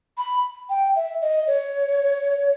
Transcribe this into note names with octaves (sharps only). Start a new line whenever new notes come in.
B5
G5
E5
D#5
C#5